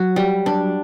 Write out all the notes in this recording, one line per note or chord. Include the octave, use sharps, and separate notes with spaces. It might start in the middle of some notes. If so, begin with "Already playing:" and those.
Already playing: F#3 F#4
G3
D4